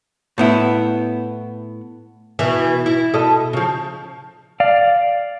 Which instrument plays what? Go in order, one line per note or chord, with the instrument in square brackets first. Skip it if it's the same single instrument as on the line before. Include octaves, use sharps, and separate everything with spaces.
[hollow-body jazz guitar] A2 B3 E4
[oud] B2 E3
E4
B2 A4 D#5
C#3 F3
[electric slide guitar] D5 F5